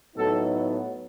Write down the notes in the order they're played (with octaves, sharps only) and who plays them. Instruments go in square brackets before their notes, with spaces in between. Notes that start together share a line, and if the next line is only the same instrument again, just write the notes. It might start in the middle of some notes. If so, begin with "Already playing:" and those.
[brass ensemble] A2 F#3 B3 D#4 A4